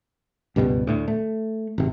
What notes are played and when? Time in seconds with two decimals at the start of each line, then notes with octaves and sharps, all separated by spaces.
0.56 C#2 G2 B2 G3
0.87 D2 A2
1.08 A3
1.78 G#1 C3